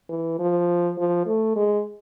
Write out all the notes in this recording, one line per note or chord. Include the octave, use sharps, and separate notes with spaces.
E3
F3
F3
A3
G#3